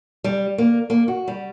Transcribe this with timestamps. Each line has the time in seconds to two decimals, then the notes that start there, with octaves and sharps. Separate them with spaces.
0.24 G3
0.58 A#3
0.90 A#3
1.08 F#4
1.28 G3